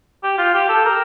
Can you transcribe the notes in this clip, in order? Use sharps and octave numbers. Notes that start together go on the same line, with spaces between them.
G4
F4
G4
A4
A#4